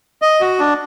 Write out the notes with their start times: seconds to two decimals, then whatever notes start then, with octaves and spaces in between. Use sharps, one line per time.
0.22 D#5
0.41 F#4
0.60 D4